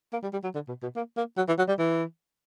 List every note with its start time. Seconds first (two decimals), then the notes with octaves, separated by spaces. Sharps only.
0.13 A#3
0.23 G3
0.33 G3
0.44 F#3
0.55 D3
0.68 B2
0.82 B2
0.96 A#3
1.17 A#3
1.38 F#3
1.48 E3
1.58 F#3
1.68 G3
1.79 E3